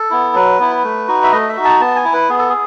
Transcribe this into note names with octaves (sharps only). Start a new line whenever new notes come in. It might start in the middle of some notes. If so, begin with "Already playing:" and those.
Already playing: A4
B3 E4
F#3 B4
B3 E4
A3
D#4 F#4
E5
A3 D#5
E5
D#4 F#4
A5
B3 A5
G#5
E4
B4
B3 G#4
A4
G#4